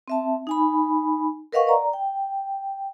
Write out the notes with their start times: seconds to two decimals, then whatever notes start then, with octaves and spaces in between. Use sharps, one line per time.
0.08 C4 E5 A5
0.47 D#4 G#5 B5
1.52 A#4 B4 D#5 F5 F#5 C#6
1.67 D5 A#5
1.93 G5